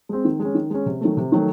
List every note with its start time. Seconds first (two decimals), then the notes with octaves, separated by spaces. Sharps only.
0.09 G#3 C4
0.25 D#3
0.40 G#3
0.45 C#4
0.55 D#3
0.70 G#3 C#4
0.86 C3
1.01 D#3 F#3 A3
1.17 C3
1.32 D#3 F#3 A3